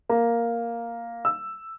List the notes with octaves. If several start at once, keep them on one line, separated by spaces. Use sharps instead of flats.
A#3
E6